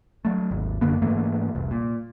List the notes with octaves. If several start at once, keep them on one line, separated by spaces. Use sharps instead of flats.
F#3 A3
G#1 D#2
F#2 D3 A#3 B3
G#2 E3 A3 A#3
F1 C2
A#2